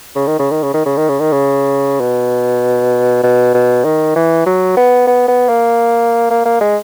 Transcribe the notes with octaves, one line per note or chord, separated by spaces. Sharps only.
C#3
D#3
C#3
D#3
C#3
D#3
C#3
D#3
C#3
D#3
C#3
B2
B2
B2
D#3
E3
F#3
B3
B3
B3
A#3
A#3
A#3
G#3